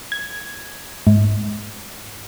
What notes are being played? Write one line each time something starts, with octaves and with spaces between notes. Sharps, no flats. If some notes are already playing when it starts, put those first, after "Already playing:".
G#6
G#2